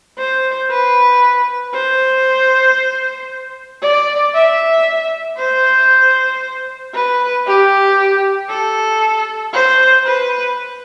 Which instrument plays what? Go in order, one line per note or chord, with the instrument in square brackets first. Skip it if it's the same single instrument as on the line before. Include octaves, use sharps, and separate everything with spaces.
[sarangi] C5
B4
C5
D5
E5
C5
B4
G4
A4
C5
B4